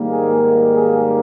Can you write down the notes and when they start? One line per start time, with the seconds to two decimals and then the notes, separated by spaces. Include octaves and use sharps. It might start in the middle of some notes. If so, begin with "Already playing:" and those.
Already playing: G#2 D#3 G3 A#3
0.11 G#4
0.76 G#4